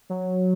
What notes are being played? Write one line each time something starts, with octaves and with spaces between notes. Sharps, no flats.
F#3